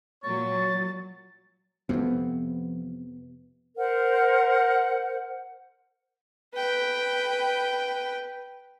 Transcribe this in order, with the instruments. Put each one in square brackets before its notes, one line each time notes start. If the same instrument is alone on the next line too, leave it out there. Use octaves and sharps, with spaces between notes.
[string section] A#2 F#3 [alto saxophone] C#5 [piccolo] A6
[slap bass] F2 C3 [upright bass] F3 C4 [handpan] B3
[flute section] A#4 C5 F#5
[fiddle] B4 G5